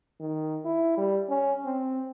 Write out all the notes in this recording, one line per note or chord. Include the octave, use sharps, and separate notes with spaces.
D#3
E4
G3
C#4
C4